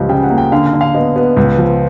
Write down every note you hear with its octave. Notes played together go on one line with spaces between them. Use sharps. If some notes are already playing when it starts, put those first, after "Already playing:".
Already playing: C#2 F3 G3 D#5
C#3 G5
F#5
A#3
G5
D3 F5
F5
D3
F5
B3 D#5
B3
C#2
F3